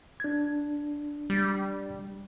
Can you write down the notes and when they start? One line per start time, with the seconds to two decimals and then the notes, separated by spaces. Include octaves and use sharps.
0.20 D4 G#6
1.30 G3